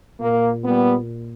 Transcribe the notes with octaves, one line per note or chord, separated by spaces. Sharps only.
A#2 A#3
G3 B3